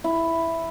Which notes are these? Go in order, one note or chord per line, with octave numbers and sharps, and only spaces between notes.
E4